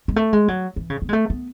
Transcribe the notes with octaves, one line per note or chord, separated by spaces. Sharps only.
G#3
A3
G#3
F#3
E3
C#3
B3
G#3
A3
B3